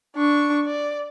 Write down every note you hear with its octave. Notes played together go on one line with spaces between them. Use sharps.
D4 C#6
D5